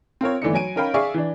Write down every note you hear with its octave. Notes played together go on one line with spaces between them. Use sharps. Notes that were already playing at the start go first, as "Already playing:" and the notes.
C4 F4 A#4 C#5
G1 E3 A3 D4 D#4 C#7
F#3 G#5 D7 D#7
C#4 D#4 A#4 F5 G5 B5
G#4 D5 E5 F5 C#6
E3 D4